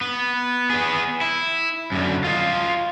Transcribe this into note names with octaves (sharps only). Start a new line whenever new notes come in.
B3
B3 G#4
E4
F#2 D3
F4 D#5